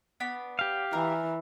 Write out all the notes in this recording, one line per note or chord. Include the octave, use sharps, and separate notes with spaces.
B3 D4 B5
G4 F5
E3 A#4